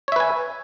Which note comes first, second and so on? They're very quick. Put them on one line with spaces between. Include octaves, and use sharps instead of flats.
C#5 E5 B4 G#5